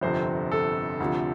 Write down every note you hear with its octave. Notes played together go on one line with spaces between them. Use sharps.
G1 F2 C3 C5
A4
D2 C3 F3